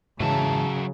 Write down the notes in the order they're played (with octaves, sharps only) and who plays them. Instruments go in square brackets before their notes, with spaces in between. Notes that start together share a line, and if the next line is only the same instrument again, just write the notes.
[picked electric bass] G#2 E3 [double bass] C#3 [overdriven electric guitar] F#3 E5 [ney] A5